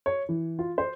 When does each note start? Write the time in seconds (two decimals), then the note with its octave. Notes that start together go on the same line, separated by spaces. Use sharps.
0.06 C#5
0.29 E3
0.59 F4
0.78 C5